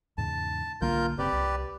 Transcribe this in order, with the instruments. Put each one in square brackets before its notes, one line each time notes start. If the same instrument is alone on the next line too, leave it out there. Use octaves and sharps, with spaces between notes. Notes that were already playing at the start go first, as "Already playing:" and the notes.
[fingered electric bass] E2 G#2 C#3 [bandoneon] A5
[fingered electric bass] B1 D3 A#3 [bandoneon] F4 A#4 G6
[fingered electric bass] F#1 C#3 C4 [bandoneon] G4 B4 D5
[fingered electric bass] C2